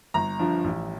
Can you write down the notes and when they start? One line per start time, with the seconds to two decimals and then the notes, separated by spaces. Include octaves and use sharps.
0.14 G1 A#5
0.39 G2 F3
0.64 A1